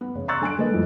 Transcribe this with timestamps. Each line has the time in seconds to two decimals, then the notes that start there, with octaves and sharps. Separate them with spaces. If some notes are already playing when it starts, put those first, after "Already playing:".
0.01 B3
0.15 C#3
0.28 A#5 C6 C#6 E6 F#6 A6
0.41 D3 G#5 F#6 D7
0.58 G#3 A#3 A4 B4 D#5
0.70 F2 E3 G3 A3